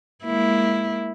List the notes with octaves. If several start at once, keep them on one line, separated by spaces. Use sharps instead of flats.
G#3 A#3 E4